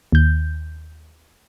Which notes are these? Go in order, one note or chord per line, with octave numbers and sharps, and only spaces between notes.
D#2 G6